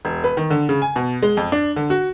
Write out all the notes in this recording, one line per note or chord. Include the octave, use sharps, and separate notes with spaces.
E1
B4
D#3
D3
C#3
G#5
B2
G#3
F2
D4
D3
F#4